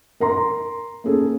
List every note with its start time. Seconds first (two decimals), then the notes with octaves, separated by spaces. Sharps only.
0.20 A#4 A#5 C6
1.04 A#3 C#4 G#4 A4